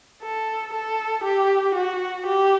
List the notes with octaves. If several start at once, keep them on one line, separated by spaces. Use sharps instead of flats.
A4
A4
G4
F#4
G4